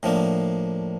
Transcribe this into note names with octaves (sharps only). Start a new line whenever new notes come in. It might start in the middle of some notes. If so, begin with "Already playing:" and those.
A2 F3 A#3 D4